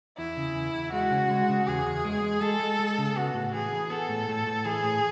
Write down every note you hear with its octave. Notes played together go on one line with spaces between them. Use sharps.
E2 E4
C#3
E2
E2
G#3 F#4
C#3
G#3
C#3
E2 G#4
E2
G#3
G#3
G#3 A4
G#3
G#3
C#3
B3 F#4
A2
E3 G#4
E3
B3 A4
A2
A2
A2
E3 G#4
A2